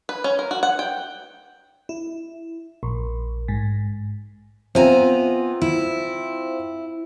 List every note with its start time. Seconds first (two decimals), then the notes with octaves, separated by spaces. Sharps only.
0.09 B4
0.24 C#4
0.39 A#4
0.51 F#4
0.63 F#5
0.79 G5
1.89 E4
2.83 A#1
3.48 G#2
4.75 B3 C4 F4 E5 G#5 A#5
5.62 E4